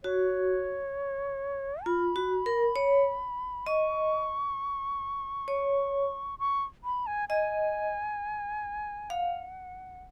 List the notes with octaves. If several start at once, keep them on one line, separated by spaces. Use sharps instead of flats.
F#4 C#5
F4 B5
F#4
A#4
C#5
D#5 C#6
C#5
C#6
B5
G#5
D#5 G#5
F5 F#5